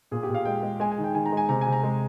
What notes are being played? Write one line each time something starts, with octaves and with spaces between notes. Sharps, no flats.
A#2 G#4
G4
A#2
F5
G#3 G5
G#3
G#3 G#5
G#5
D#3
G5
D#3 G#5
A#5
G#3 G#5
C3 A#5
G#5
C3
A#5
G#3